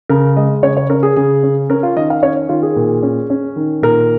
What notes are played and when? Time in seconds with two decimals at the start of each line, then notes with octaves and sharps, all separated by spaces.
0.09 C#3 A#4
0.37 G#3 D#5
0.63 C#3 C#5
0.77 C#5
0.89 C#4 A#4
1.03 G#4
1.16 C#3 G#4
1.43 C#4
1.70 C#4 A#4
1.83 F4
1.96 D#3 D#5
2.10 F5
2.22 C#4 C#5
2.49 D#3 F4
2.63 G#4
2.76 A#2
3.03 C#4
3.30 C#4
3.56 D#3
3.82 A#2 A#4